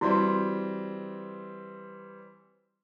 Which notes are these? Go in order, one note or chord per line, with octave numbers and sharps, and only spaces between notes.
E3 G3 C4 E4 F#4 C6